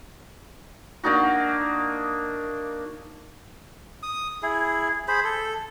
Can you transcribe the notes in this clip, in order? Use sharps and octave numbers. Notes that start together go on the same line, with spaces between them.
A#3 D4 D#4 F#4
D#6
E4 G#4
G#4 C5 B5
A4